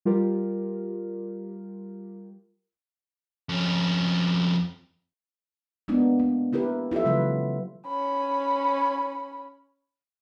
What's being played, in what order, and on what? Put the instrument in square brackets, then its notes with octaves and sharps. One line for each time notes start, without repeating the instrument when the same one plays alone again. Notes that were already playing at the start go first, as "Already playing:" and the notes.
[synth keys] G3 F4 G4 A#4
[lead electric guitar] F2 C#4
[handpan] G#3 A#3 B3 D4 D#4
A#3
A#3 E4 G4 A#4 B4
E4 F4 G4 A4 E5
C#3 E3 F#3 G#3 B4
[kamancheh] C#4 B5